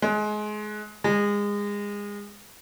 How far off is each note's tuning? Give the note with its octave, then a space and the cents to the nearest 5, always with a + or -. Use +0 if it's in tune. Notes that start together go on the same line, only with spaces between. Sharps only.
G#3 +25
G#3 -25